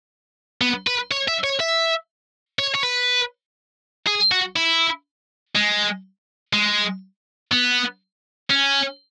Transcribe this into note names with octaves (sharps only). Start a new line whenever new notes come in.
B3
B4
C#5
E5
C#5
E5
C#5
C#5
B4
G#4
F#4
E4
G#3
G#3
B3
C#4